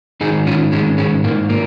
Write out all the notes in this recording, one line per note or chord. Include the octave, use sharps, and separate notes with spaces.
G#2 D#3 D#4 G#4
C#4 F4
G#2 D#3 G#3 C#4
G#3 C#4
G#2 D#3 A#3
A#3